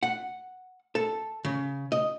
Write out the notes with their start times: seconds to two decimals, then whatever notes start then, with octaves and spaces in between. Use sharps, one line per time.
0.03 F#5
0.95 A4
1.45 C#3
1.92 D#5